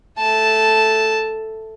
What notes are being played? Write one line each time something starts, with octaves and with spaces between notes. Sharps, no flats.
A3 A5